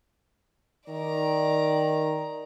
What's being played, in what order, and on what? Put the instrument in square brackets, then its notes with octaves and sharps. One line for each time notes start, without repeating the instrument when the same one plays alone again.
[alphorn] D#3 [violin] D5 A#5